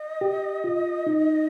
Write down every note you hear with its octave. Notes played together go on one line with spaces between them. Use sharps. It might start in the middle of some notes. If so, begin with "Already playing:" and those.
Already playing: D#5
G4
F4
D#4